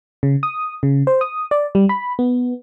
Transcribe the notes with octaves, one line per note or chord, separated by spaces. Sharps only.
C#3
D#6
C#3
C5
D#6
D5
G3
B5
B3